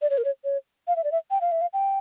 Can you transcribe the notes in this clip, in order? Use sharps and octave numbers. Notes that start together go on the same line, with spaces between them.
D5
C#5
A#4
C#5
C#5
F5
E5
D5
E5
G5
F5
E5
F5
G5